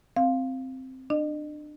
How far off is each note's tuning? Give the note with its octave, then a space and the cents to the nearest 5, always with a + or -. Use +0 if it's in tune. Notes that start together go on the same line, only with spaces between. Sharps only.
C4 +0 F5 +0
D4 +30 D#5 -35